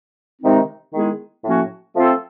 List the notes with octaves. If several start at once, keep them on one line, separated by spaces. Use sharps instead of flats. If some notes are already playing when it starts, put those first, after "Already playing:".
C3 D#3 G#3 C4 D#4
D#3 G#3 B3 E4 G#4
A2 F3 A#3 C#4 F#4
F3 A3 C4 F4 A4